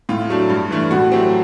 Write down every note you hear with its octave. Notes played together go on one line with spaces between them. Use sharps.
A2 F4
F#3 A3 D4
G2
E3 A3 D4
A2 F#4
F#3 A3 C4 G4